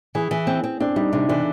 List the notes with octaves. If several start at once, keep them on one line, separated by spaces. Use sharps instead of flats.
E3 G#4
E3
C4
C4
C4 D4
G3 D#4
C3 D4
E3 D4